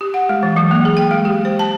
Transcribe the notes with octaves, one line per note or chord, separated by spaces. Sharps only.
G4
F#5
G#3
E3
F#3
A#3
G#4
G5
G#3
G4
C5
A5